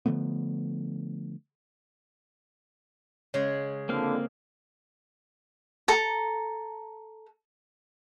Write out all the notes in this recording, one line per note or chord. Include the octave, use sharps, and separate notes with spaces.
D3 F3 A3 B3
C#3 G#3 C#5
F2 D3 A#3 C4 F5
A4 A#5